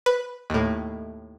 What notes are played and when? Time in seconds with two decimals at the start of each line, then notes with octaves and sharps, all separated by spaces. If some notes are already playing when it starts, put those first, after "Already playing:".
0.06 B4
0.50 D#2 A2